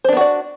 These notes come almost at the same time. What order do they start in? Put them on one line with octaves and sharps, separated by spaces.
C5 D4 B3 F#4 D5